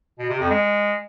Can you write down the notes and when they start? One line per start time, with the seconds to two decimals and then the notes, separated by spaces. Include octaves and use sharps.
0.19 B2
0.29 C3
0.40 F2
0.50 G#3